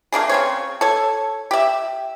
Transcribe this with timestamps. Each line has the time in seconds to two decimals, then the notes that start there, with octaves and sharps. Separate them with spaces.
0.12 A3 A#3 D4 G#4
0.29 C#3 C4 C#5
0.81 A4 C#5
1.51 G4 E5